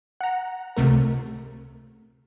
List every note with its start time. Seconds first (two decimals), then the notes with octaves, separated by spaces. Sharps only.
0.21 F#5 A#5
0.77 C#2 C3 A3 A#4